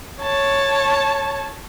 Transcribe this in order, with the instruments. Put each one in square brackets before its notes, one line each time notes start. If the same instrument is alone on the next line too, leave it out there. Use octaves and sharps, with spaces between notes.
[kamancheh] C#5 A5